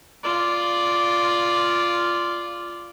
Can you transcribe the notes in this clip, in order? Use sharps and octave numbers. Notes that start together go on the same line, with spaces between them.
F4 D5